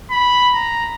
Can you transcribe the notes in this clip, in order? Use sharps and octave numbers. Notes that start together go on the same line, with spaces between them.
B5
A#5